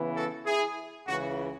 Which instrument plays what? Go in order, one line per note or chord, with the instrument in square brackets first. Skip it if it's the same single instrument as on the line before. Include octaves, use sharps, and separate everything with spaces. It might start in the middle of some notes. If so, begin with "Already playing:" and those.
Already playing: [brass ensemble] C#3 E3 B3 E4
F#4 A4
E4 G#4
C#2 C#3 E3 F#4